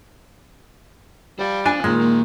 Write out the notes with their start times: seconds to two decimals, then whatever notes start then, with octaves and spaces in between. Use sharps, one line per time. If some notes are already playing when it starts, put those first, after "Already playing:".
1.39 G3 C5 F5
1.66 D4 C5 F5 G#5
1.84 A#2 D#3 G#3
2.01 C2 A#3